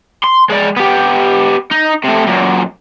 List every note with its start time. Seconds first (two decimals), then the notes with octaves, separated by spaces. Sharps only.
0.24 C6
0.50 G#3 D5
0.76 B3 G4
1.71 D#4
2.04 C3 A3
2.26 F#2 A#2